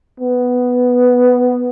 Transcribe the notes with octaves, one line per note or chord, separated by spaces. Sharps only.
B3